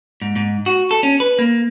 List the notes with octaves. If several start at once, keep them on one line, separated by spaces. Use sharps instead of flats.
G#2
G#2
F#4
A4
C#4
B4
A#3